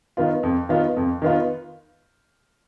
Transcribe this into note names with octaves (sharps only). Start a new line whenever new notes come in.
D#3 B3 F4
F2
D#3 B3 F4
F2
D#3 B3 F4